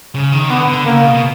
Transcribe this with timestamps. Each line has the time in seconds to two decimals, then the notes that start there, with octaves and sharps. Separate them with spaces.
0.15 C#3
0.32 D#3
0.50 D3 B3
0.67 D3
0.85 C#3 A#3
1.03 B2
1.14 B2